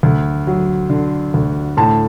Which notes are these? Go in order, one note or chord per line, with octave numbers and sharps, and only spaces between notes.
D2
F#3
D3
D2
A2 A5